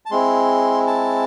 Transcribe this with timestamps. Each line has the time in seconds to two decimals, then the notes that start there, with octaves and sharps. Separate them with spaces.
0.06 A5
0.10 G#3 C4 E4 C6
0.87 A5